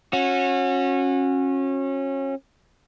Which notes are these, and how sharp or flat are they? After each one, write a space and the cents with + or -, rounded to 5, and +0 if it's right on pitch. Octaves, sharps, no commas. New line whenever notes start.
C#4 -25 F#4 -30